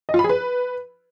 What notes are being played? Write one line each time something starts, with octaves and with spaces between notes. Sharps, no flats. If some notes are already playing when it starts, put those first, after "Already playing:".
D#5
F4
B5
G#4
B4